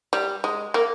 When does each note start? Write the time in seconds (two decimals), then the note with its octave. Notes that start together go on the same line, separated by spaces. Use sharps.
0.13 G3
0.44 G#3
0.74 A#3